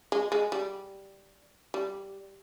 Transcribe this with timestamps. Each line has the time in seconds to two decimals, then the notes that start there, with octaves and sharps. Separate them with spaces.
0.12 G#3
0.32 G#3
0.52 G3
1.74 G3